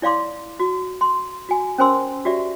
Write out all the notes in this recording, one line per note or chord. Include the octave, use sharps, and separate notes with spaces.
E4 D5 F5 C6 D6
F#4
C6
F#4 G#5
C#4 A#4 C5 G#5 C6 E6
F#4 G4 D5 E5